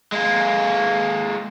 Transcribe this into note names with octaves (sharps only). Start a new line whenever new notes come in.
G#3 A#3